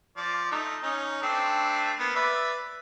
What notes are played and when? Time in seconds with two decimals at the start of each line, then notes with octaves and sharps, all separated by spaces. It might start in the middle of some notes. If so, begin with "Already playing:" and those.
0.17 F3 D5
0.51 A3 D#4
0.83 C#4 D#4
1.23 A3 C4 D4
1.99 A#3 B3
2.16 B4 D5 E5